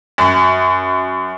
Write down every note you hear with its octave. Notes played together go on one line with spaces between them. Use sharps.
F#2